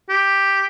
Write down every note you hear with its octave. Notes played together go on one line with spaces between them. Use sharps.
G4